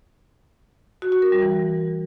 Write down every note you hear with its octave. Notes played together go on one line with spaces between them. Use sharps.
F#4
F#4
A#4
G3
E3